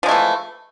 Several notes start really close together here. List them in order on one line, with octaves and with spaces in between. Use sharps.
F3 G#3 A3 E3